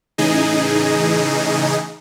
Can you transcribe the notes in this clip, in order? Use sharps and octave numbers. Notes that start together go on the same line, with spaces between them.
A2 C#3 E3 D#4 G#4 D#5